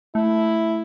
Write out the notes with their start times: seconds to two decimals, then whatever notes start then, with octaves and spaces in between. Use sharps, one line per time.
0.15 A3 E4